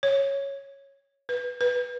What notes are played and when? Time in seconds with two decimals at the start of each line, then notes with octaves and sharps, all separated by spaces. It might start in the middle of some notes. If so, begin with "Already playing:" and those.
0.03 C#5
1.29 B4
1.61 B4